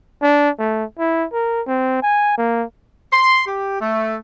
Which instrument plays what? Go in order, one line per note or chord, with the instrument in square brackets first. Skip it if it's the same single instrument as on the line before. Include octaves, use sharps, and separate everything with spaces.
[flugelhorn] D4
A3
E4
A#4
C4
G#5
A#3
[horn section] C6
G4
A3